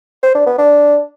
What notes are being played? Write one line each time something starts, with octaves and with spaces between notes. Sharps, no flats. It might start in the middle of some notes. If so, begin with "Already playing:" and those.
C5
D4
B3
D4